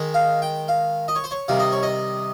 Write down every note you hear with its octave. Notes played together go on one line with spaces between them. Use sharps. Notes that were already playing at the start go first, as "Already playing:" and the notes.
Already playing: D#3 G#3
F5
G5
F5
D#5
C#5
C5
C#5
C3 D#3 G3 F5
D#5
C#5
D#5